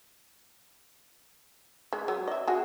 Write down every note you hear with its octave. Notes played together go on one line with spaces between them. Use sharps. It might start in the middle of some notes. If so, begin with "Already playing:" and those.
G#3
F#3
D#5 E5
F#4 G#4